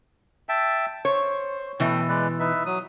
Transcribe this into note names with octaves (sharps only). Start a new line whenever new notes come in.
E5 G5 A5
C5 C#5
B2 E3 A3 G5
G#3 B4 D5
D#4 B4 E5
F#3 D#6